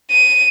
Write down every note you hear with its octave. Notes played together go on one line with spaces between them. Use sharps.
D#7